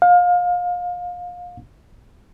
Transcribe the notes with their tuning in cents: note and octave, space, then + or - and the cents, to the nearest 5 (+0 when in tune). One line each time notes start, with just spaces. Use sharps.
F5 +30